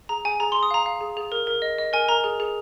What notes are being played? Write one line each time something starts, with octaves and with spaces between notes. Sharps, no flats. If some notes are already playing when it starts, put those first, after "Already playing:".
G#4 A#5
G#4 G#5
G#4 A#5
G#4 C6
D#6
F5 A#5
F5
G#4
G#4
A#4
A#4
D#5
D#5
A#4 G#5
A#4 A#5
G#4
G#4